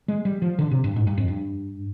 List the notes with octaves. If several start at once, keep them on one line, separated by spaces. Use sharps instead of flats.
G#3
G3
F3
D3
C3
G2
G#2
G2
F2
G2